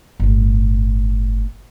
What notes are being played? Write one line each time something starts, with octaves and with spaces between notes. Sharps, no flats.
G1 A2